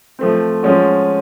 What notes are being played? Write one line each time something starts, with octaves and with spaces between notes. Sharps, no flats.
F3 A3 C4
F3 G#3 C#4 F#4